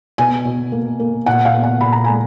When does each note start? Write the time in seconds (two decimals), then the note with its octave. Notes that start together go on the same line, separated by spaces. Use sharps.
0.18 B2 G#5
0.45 B2
0.72 A#3
1.00 A#3
1.26 A#2 F#5
1.45 F5
1.54 B3
1.63 F#5
1.81 A#2 B5
1.92 A#5
2.04 G#3 G#5